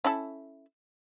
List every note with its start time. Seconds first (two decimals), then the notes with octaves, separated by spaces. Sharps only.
0.04 C#4 E4 A4